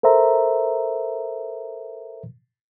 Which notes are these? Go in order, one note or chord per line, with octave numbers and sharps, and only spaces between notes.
A4 A#4 C5 E5 A#5